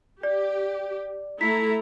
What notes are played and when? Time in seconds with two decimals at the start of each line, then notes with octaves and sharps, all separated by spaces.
0.23 G4 D5
1.41 A3 E4 A#5 B6